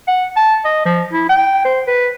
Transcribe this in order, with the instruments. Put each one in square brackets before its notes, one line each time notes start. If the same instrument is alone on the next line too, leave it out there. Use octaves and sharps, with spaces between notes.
[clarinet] F#5
A5
D#5
F3
E4
G5
C5
B4